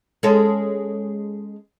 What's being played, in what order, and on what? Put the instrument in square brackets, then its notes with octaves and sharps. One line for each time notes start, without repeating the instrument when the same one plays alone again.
[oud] G#3 C#4 A4